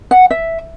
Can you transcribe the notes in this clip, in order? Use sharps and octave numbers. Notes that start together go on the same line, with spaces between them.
F#5
E5